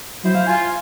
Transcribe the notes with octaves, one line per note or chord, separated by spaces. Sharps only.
F#3 E4 C5
F5
F4 G#5